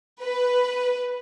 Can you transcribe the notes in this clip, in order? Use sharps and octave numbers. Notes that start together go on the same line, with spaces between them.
B4